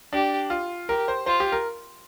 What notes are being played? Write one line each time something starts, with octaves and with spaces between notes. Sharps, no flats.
D4 G4
F4
G4 A#4
C5
F4 C5
G4
A#4